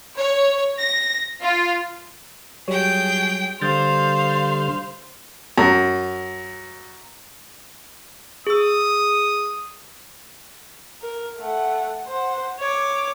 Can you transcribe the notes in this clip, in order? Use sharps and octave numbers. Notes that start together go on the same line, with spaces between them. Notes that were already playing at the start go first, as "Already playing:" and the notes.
C#5
A#6
F4
F#3 G3 G#4 C#5 G5
D3 G3 C5 F5 D#6 F6 G6 A6
F#2
G#4 D#6 E6
A#4
A3 F#5
C5 F#5
C#5 D6